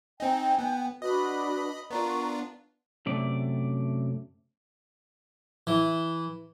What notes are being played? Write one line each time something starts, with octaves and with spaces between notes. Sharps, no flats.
C4 D#4 G5 G#5
B3
D4 F#4 B4 D#5 B5
B3 D4 F4 A#4 A#5 C#6
F#2 C3 A3 D5
E3